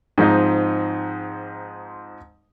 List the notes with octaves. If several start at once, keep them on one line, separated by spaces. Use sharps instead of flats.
G#2 F3 C4 D#4